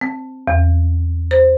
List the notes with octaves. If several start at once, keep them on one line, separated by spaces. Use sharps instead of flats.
C4
E2
C5